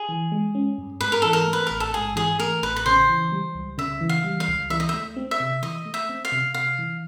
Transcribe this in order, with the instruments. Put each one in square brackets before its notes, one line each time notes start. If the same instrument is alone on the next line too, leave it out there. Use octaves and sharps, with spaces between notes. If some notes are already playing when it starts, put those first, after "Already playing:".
Already playing: [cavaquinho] G#4
[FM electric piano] E3
G#3
C#4
G2
[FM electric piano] G#2 [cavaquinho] B4
[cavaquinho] A#4
[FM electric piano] E3 [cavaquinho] A4
[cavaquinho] A#4
[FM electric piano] A3
[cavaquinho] B4
[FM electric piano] A1 [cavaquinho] A#4
[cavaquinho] A4
[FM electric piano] G#2 [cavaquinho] G#4
[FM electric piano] E3 [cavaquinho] G#4
[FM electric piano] A3 [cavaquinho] A#4
[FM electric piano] A1 [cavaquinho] B4
[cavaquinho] B4
[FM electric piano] C#3 [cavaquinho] C5
[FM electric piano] E3
G3
C#2
[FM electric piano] C#3 [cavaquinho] E5
[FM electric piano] E3
[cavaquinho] F5
[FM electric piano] G3
[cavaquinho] F5
[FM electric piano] C#2
[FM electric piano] E3 [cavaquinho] E5
[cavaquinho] D#5
[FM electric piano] A3 [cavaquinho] E5
[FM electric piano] C4
[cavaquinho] E5
[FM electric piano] C3
[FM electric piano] E3 [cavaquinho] D#5
[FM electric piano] A3
[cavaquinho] E5
[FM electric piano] C4
[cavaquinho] F5
[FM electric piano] C3
[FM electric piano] C3 [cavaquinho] F5
[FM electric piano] E3